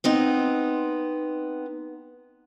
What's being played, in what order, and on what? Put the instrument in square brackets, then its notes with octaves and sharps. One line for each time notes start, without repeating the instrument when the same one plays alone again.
[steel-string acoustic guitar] B3 C4 D#4